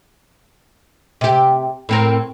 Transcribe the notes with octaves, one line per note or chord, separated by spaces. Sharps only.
C3 G4
A2 C4 A#4